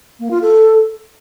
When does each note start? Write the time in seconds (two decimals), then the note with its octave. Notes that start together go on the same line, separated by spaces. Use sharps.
0.20 A#3
0.31 F4
0.42 A4